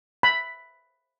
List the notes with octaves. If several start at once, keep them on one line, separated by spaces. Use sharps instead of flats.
B5